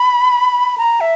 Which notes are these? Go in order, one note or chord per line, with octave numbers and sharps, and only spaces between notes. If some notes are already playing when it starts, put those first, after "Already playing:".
Already playing: B5
A#5
E5